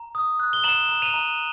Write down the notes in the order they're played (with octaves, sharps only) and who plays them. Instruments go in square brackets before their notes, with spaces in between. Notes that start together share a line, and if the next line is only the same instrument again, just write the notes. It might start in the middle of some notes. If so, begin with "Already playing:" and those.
Already playing: [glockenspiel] A#5
D#6
F#6
G7
A#5 E7 F#7
A#5
D#7 F7
A#5